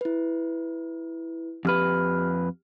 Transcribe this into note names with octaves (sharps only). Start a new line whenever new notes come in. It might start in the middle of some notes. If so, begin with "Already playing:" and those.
E4 B4
F2 G4 B4 F6